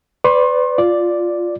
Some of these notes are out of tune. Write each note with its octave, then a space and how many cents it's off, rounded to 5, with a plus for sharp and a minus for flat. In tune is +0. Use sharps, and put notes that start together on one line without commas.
B4 +25 D5 -10 C6 +40
F4 +0 D5 +0